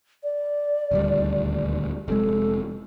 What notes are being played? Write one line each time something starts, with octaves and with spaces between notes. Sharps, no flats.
D5
D#1 D2 G3
F1 C3 G#3 A4